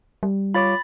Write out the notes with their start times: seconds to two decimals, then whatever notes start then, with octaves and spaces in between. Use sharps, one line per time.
0.23 G3
0.54 F4 C#5 B5 D6 A6